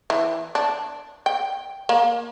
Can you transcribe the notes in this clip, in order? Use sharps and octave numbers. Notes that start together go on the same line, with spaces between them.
E3
D4
G5
A#3